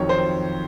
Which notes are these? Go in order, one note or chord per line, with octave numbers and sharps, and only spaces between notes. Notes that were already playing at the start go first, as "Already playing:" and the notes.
Already playing: F2 D#3 F#3 C#5
C5